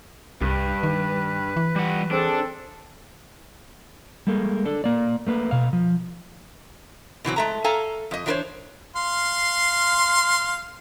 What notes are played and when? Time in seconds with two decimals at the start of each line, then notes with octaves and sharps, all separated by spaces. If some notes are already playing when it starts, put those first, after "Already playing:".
0.41 C2 G2 B4
0.83 D#3
1.57 E3
1.76 G3 F#5
2.11 C4 D4 G#4 A4
4.27 G3 G#3 A#3 A4
4.65 D4 A4
4.84 A#3 D5
5.27 A3 A#3 B4
5.51 B2 F5
5.73 F3
7.25 B2 E3 F#3 C4
7.36 G#3 A3 A#5
7.64 A4 F5 G#5 A#5
8.11 F2 D#5
8.26 E3 F#3 D4 A#4 C5 C#5
8.96 F5 C6